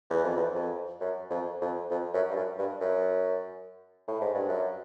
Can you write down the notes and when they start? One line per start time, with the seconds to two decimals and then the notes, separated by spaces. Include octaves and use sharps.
0.10 E2
0.24 F2
0.36 E2
0.55 F2
1.01 F#2
1.30 F2
1.61 F2
1.90 F2
2.14 F#2
2.30 G2
2.36 F#2
2.58 G2
2.81 F#2
4.08 A2
4.21 G#2
4.34 G2
4.49 F#2